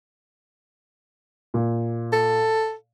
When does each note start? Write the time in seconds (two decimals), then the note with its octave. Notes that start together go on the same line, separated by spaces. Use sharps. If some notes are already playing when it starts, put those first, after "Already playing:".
1.54 A#2
2.13 A4